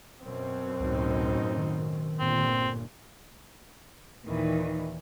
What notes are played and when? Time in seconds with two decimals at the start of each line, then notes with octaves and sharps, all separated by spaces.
0.23 F#2 B2 C4
0.80 C#2 A2 D#4
1.58 D#3
2.20 G1 A#2 C4
4.25 D#2 A#2 D#3 E3